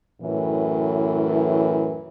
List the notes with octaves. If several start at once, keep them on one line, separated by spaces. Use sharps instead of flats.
F#2 A2 E3